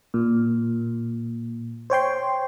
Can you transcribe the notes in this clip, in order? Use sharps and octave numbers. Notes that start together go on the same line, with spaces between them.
A#2
C5 C#5 G5 C6